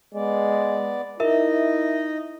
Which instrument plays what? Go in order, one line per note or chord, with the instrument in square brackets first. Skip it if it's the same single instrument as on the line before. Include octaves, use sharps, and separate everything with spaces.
[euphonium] G#3 [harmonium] B3 D5
[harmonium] D#4 D#5 [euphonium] E4 [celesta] A#4 E5